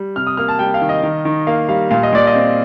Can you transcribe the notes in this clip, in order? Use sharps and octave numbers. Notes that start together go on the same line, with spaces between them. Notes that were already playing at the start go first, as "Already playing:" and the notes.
Already playing: G3
C3 F6
D#6
A#3 F6
A5
G3 G5
F5
D#3
D#5
D#3
D#3
A#3 F5
G3 F5
A#2 F5
D#5
A#2 D5
D#5
C4